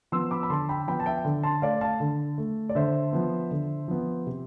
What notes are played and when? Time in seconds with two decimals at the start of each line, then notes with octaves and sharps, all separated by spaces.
0.12 F3 B3 C6 E6
0.31 B5 D6
0.43 B5
0.50 D3 A5 C6
0.69 G5 B5
0.87 F3 B3 G5 B5
1.00 A5
1.06 E5 G5
1.25 D3
1.43 A5 C6
1.62 A3 D5 F5
1.81 F5 A5
2.00 D3
2.38 A3
2.69 D5
2.75 D3 C5 E5
3.13 F3 B3
3.51 D3
3.88 F3 B3
4.27 C3